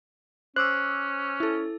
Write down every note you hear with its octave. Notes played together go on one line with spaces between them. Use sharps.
C#4 C5 D6 E6 F#6
E4 A4